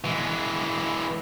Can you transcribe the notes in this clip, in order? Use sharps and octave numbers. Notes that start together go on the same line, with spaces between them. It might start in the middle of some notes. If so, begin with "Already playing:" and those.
E3 G#3